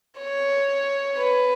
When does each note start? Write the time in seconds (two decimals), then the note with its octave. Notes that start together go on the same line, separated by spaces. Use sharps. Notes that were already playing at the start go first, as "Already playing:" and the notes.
0.19 C#5
1.17 B4